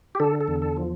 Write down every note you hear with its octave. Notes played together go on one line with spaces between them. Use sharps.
G4
D3 A4
A4
E2
A4
F3